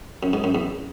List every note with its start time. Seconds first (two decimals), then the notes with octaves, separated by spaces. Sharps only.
0.23 F#2
0.33 G#2
0.44 F#2
0.55 E2